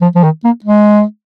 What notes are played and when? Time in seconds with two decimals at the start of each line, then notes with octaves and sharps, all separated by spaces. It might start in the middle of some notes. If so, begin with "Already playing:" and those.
0.01 F3
0.15 F3
0.23 D#3
0.44 A#3
0.64 G#3